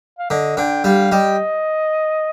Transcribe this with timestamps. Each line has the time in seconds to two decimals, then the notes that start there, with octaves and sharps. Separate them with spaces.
0.19 F5
0.30 D3 D#5
0.57 D3 G5
0.84 G3 F5
1.12 G3 D#5